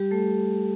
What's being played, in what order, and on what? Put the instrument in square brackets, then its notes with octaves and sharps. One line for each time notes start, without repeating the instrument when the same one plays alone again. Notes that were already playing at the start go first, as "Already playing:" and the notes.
Already playing: [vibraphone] G3 G4
A3 A4